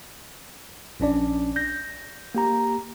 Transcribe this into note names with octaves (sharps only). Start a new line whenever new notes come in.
A#1 C#4 D4 D5
G6 A#6
A#3 G4 A#5